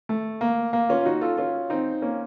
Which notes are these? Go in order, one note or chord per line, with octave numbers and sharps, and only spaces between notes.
A3
A#3
A#3
C#4 F4
F4
D#4 F#4
F4 A4
C#4 F4
C4 D#4
A#3 C#4